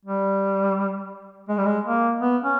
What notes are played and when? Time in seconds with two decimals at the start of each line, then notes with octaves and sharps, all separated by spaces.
0.05 G3
1.49 G#3
1.58 G3
1.66 G#3
1.84 A#3
2.21 B3
2.44 C#4